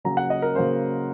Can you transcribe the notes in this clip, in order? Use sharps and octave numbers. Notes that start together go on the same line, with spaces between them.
C#3 F#3 A#3 C#4 A#5
F#5
D#5
A#4
C#3 F#3 A#3 C#4 C5